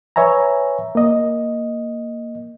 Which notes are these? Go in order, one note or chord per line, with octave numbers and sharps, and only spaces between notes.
B4 C#5 E5 G#5 A#5
A#3 D#5